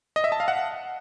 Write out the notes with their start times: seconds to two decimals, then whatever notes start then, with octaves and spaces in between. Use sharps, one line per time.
0.16 D#5
0.24 E5
0.32 A5
0.40 F5
0.48 F#5